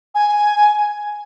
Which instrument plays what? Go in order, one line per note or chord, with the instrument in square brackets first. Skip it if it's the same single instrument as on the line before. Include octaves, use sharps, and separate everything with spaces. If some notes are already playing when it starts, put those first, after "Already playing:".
[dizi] G#5